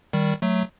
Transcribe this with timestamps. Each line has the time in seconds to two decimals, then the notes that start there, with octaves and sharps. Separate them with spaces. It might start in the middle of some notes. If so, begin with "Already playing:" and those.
0.13 D#3 G3
0.42 F#3 A3